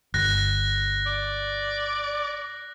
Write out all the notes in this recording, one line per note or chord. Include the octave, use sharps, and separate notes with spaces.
G1 F#6 A#6
D5